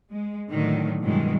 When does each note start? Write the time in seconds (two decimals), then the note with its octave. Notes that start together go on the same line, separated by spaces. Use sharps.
0.11 G#3
0.50 A2 D3 D#3 F#3
1.01 G2 B2 D#3 E3 F#3 G#3